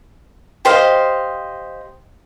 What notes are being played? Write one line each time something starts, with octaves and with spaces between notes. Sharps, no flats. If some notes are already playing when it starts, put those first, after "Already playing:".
G4 C5 D#5 F5